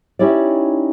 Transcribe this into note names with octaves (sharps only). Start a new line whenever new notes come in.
C#4 D#4 E4 G4 C#5 D5